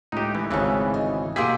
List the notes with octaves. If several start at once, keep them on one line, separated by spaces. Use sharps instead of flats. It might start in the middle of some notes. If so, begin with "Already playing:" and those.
C#2 A2 D#4 G4
E3
G#1 C#3 E3 A4 B4
D#4
B2 A#3 G4 G#4 C6 E6 B6